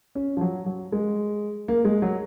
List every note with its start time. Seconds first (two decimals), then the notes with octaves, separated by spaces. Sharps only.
0.15 C#4
0.37 F3
0.41 F#3
0.66 F#3
0.92 G#3
1.68 A#3
1.85 G#3
2.02 F#3